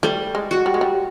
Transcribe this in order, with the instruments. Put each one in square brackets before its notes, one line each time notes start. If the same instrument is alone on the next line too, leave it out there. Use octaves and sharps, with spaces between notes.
[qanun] G3 [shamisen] A3
[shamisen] G#3
[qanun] F#4
[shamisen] G3
G#3
G3